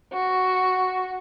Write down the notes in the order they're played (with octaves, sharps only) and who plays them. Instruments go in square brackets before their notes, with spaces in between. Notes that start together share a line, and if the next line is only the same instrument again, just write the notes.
[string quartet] F#4